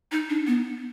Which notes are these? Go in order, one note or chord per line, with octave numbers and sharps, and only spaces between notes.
D#4
D4
B3